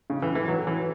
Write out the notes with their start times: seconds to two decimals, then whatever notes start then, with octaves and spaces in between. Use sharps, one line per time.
0.10 C#3
0.22 E3
0.35 E3
0.48 F#3
0.67 E3